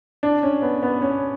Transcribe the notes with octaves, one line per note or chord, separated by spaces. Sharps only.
D4
C#4
B3
B3
C#4